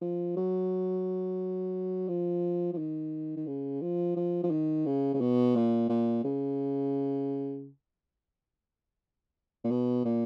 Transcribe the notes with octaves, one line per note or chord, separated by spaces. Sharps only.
F3
F#3
F3
F3
D#3
D#3
C#3
F3
F3
F3
D#3
C#3
C#3
B2
A#2
A#2
C#3
A#2
B2
A#2